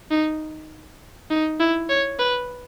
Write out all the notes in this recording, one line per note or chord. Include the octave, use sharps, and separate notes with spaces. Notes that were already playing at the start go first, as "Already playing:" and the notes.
D#4
D#4
E4
C#5
B4